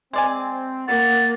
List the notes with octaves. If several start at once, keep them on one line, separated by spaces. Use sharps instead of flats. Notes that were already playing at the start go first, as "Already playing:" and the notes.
G#3 C4 D5 G#5
A#3 F#5 A6